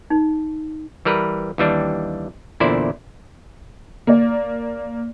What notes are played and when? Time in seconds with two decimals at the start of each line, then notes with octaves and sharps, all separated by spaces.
0.10 D#4
1.05 E3 G3 A#4 B4
1.58 D#2 E3 G3 D4
2.60 E2 A#2 D3 E4 C5 D5
4.07 A#3 D5